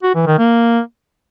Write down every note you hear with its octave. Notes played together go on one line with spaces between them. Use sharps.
F#4
E3
D#3
A#3